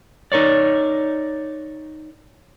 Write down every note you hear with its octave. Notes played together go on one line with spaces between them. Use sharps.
D#4 A#4 C#5 D5